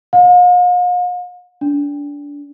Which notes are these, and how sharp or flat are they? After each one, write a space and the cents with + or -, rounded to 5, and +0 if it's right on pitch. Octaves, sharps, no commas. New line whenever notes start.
F5 +45
D4 -25